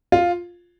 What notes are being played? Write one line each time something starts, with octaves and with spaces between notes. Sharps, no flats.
F4